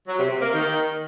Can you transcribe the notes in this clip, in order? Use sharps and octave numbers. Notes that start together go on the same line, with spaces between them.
F#3
C3
C3
A#3
D#3